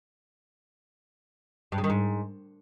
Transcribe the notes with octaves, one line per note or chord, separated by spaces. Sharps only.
G2
C#3
D#3
G#2